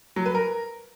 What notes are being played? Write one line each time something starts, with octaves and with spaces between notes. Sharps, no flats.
F#3
B4
A#4